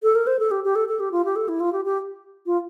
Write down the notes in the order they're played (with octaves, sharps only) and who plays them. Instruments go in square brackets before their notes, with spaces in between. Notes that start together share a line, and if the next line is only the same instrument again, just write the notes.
[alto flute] A4
A#4
C5
A4
G4
G4
A4
A4
G4
F4
G4
A4
E4
F4
G4
G4
F4